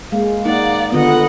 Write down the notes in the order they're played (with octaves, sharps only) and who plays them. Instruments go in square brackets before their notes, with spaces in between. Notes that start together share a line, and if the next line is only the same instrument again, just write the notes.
[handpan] G#3 A#3 [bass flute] F5
[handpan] A#3 D#4 [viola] D5 F#5
[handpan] D3 D#3 B3 [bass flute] F4 [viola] D#5 F#5